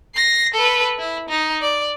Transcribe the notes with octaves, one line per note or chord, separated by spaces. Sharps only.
A#6 C7
A4 B4
E4
D#4
D5